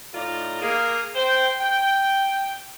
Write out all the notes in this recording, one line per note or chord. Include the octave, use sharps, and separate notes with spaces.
A2 D#4 F4 D5 A#5
A#3 G#4 A#4
C5 G5
G5